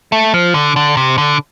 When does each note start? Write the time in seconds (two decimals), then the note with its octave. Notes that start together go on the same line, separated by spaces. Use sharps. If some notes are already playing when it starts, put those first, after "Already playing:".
0.12 A3
0.34 F3
0.54 D3
0.76 D3
0.97 C3
1.18 D3